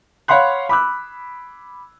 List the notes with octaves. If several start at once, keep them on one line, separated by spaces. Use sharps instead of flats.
C#5 F5 F#5 B5 C6 F#6
B5 D6 E6 F#6